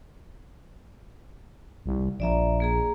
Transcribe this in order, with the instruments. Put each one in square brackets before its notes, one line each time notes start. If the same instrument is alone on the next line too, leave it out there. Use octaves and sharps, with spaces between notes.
[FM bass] C2
[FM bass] A#1 [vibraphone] D5 E5 A#5
[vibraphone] A#3 G#4 A#5